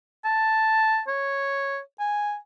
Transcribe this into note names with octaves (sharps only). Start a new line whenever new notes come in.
A5
C#5
G#5